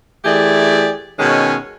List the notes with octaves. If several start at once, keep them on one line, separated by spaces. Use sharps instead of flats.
E3 A3 G4 G#4 D5
B2 D#3 G#3 C#4